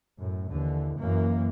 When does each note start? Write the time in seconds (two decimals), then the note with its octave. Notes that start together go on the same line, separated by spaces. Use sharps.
0.19 F#2 A2
0.51 D#2 D3 E3
0.97 F#2 E3 A#3